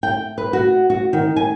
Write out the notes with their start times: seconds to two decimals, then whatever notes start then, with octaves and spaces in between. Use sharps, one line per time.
0.03 G5
0.38 B4
0.53 F#4
0.90 F#4
1.13 D#3
1.36 G#5